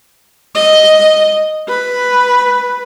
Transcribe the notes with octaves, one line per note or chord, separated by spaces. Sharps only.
D#5
B4